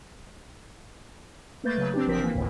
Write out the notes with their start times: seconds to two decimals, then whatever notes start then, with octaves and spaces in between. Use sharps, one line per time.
1.64 A3 A#3 B4 G6 A6
1.76 C#3 F#3 B4
1.94 C4 D4 G4
2.07 G1 F3 C4 A#4 B6
2.20 E3 A#3
2.35 G1 D2 A2